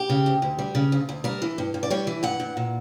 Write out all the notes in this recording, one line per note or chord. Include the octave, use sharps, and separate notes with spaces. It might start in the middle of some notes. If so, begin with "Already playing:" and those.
Already playing: G4
C#3
D2
D2
G3
C#3
D2
D2
G3 A#4
E3
G2
G2
D5
G3 C#5
E3
G2 F#5
G2
A#2